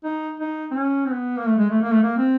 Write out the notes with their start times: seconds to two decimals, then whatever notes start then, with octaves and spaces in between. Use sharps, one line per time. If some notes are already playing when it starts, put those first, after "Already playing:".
0.04 D#4
0.40 D#4
0.71 C4
0.76 C#4
1.06 C4
1.11 B3
1.38 A#3
1.47 A3
1.58 G#3
1.70 A3
1.82 A#3
1.92 A3
2.02 A#3
2.18 C4